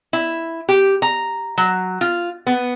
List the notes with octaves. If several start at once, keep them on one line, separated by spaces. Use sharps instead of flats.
E4
G4
A#5
F#3
F4
B3